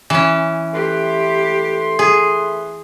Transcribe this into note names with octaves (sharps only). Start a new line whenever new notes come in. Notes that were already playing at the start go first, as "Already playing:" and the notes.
E3 C#4
A3 G4 B4 C6
G#4